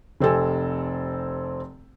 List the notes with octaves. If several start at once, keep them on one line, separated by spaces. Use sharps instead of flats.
F1 C4 G4 A4 G#5